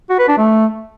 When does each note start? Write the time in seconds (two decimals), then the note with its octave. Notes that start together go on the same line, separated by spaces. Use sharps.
0.10 F#4
0.19 B4
0.28 D4
0.38 A3